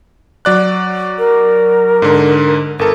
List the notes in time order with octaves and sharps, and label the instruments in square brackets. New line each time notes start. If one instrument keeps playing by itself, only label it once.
[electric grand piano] F#3 D5 F#6
[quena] A#4
[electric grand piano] G#2 D3
[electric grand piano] G1 A4 [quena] A#4